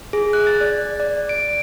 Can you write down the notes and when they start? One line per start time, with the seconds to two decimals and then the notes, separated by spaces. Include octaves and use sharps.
0.13 G#4
0.33 F#6
0.47 A6
0.61 D5
1.00 D5
1.29 D7